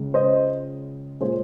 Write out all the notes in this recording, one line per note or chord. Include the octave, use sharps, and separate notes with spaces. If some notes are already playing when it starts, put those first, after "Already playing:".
Already playing: C#2 C#3 G#3
C5 D#5
A#2 G#3 G#4 C5